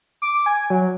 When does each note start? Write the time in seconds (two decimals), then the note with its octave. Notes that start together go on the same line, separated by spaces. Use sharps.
0.22 D6
0.46 G#5
0.70 F#3